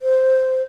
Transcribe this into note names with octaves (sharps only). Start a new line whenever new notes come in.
C5